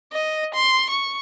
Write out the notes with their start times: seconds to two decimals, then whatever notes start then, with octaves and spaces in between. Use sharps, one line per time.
0.13 D#5
0.54 C6
0.90 C#6